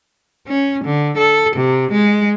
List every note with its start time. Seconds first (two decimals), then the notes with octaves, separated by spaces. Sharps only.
0.48 C#4
0.84 D3
1.18 A4
1.56 C3
1.92 G#3